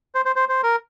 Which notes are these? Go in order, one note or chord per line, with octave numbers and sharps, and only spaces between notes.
C5
C5
C5
C5
A#4